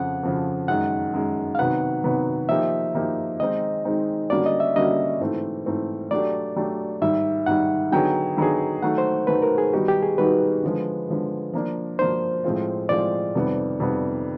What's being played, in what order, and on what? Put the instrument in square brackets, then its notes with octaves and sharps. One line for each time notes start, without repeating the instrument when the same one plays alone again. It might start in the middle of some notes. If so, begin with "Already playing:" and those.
Already playing: [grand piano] F2 C#3 F3 [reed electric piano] F#5
[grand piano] F2 C#3 F3
[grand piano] F#2 D#3 G#3 [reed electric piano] F#5
[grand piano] F#2 D#3 G#3
[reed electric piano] F5
[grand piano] C3 D#3 F#3 B3 [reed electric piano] F#5
[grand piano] C3 D#3 F#3 B3
[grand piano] F3 A#3 D#4 G4 [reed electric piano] E5
[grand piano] F3 A#3 D#4 G4
[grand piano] D#3 G#3 C4 D#4 [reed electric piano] D#5
[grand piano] D#3 G#3 C4 D#4
[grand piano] D3 G3 A#3 C#4 F#4 [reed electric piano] D5
[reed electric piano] D#5
E5
[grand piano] D3 G3 A#3 C#4 F#4 [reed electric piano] D#5
[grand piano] G#2 E3 A3 C4
G#2 E3 A3 C4
[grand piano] F#3 A3 D4 G4 [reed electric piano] D5
[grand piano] F#3 A3 D4 G4
[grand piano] G#2 D#3 G3 [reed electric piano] E5
[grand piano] G#2 D#3 G3 [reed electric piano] F#5
[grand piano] D3 F#3 B3 D#4 G#4 [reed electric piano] G5
[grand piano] D3 F#3 B3 D#4 G#4
[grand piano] D#3 F#3 A3 [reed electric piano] F#5
[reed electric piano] C5
[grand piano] D#3 F#3 A3 [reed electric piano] B4
[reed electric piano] A#4
G#4
[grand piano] D#3 G3 B3 D#4 F#4 [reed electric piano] G4
[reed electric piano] G4
G#4
[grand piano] D#3 G3 B3 D#4 F#4 [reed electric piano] B4
[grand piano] D3 F3 G#3
D3 F3 G#3
F3 A#3 D4
[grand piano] F3 A#3 D4 [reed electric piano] C5
[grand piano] A2 F3 G#3 C4 F4
[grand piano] A2 F3 G#3 C4 F4 [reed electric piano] D5
[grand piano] F2 C3 D#3 G3 B3
F2 C3 D#3 G3 B3